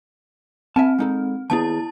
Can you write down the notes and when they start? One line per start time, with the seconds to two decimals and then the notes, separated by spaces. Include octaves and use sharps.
0.76 C4 E5 G#5 A5
0.99 G#3 D#4 A4
1.50 D#2 B3 E4 G#4 A5